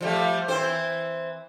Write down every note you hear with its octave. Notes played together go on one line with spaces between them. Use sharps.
F3 G3 A3
E3 C4 C5